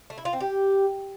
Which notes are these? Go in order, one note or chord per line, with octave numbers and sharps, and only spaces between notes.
A3
E4
F4
C4
G4